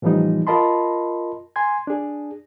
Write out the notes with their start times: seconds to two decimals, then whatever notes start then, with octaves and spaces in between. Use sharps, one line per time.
0.02 A2 E3 F3 G3 B3 D#4
0.47 F4 A#4 D#5 A5 B5 C6
1.56 G#5 C6 G#6
1.87 D4 G#4